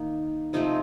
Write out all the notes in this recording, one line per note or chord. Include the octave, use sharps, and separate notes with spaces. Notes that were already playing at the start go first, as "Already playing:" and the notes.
Already playing: D#3 A#3 D#4
C3 F3 A3 D#4 D#5